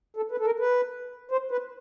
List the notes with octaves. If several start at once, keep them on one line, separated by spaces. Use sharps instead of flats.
A4
B4
A4
A#4
B4
C5
B4